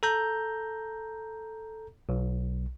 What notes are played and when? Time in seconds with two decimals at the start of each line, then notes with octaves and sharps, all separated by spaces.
0.03 A4 A#5 G6
2.09 B1